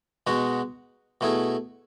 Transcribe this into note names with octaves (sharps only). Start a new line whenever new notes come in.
B2 G#3 D#4 F#4
B2 A3 E4 G#4